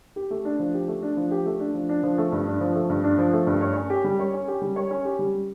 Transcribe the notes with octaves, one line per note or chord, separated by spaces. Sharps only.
G4
A3
D4
F3
G4
A3
D4
F3
G4
A3
D4
F3
D4
F3
A3
G2
D4
F3
A3
G2
D4
F3
A3
G2
C#5
C#4
G4
G3
C#5
C#4
G4
G3
C#5
C#4
G4
G3